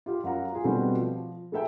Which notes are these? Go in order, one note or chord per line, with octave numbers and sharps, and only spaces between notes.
F4 G4 F5
F#2 F5 F#5 A#5
F4 G#4
B2 G3 A3 C4 F#4 B4
F3
A3 G#4 A4 E5 G5